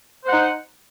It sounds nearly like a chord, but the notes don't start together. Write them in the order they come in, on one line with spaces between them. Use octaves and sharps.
C5 F#5 D#4